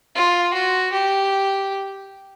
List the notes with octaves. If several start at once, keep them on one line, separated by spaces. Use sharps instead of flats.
F4
F#4
G4